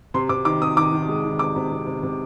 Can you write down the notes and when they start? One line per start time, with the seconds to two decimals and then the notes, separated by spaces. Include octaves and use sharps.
0.14 C3 C6
0.29 C3 D6
0.45 D#3 D6
0.61 C3 D#6
0.77 D#3 D6
0.93 D#3
1.08 G#3
1.24 D#3
1.39 C3 D6
1.56 C3
1.71 C3
1.87 C3
2.03 C3